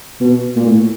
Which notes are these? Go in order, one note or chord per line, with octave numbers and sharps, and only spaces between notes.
B2
A#2
A2